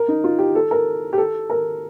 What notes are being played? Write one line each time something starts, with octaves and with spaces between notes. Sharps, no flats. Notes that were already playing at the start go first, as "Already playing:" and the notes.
Already playing: A#4
D#4
F4
G4
A4
A#4
G4
A4
A#4